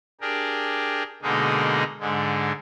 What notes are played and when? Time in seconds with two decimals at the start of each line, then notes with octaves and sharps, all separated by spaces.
0.21 D4 G4 G#4 A#4
1.22 B2 D3 G#3 A#3 D#4 G#4
2.00 G#2 D3 G#3